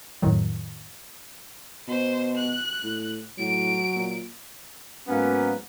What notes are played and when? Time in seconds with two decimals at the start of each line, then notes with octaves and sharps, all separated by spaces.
0.22 F2 A2 D#3 F#3
1.88 B2 C5
2.37 F#6
2.83 A2
3.38 A2 F#3 D7
3.95 A#2
5.07 G#2 F#3 A#3 B3 C#4